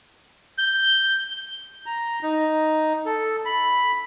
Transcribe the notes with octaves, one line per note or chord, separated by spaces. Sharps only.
G6
A#5
D#4
A4
B5